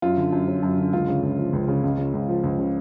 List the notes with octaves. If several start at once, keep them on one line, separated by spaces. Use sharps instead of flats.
F#2 F4
D3
F#2
F#3
F#2
D3
C#2 F4
C#3
C#2
F3
C#2
C#3
C#2
C#3
C#2
F3
C#2
C#3